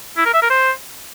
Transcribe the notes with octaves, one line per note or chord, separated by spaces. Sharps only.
E4
A#4
E5
A#4
C5